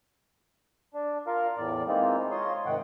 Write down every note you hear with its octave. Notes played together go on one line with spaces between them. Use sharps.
D4
F4 A#4 F5
E2 A2 D5
E3 G#3 A#3 C4 D#4 F4
F4 C#5 D#5 C6
G#2 C3 D#3 F#5 G5